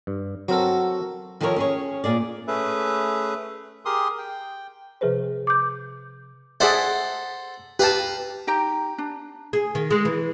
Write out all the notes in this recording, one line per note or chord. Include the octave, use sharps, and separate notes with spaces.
G2
F#3 C4 F#4 A4 A#4
D#3 F3 G4 A4 A#4 C#5
C#4 G#4 C#5
A#2 G#4 D5
A3 C#4 G#4 B4 E5
G4 G#4 A#4 C6 D#6
G5
C3 F3 G#4 B4 C5
D6 G6
G#4 A4 C5 D5 E5 F#5
G4 B4 F5 A5 A#5
D#4 G4 G5 A#5
D4
G#4
D#3
G#3
E3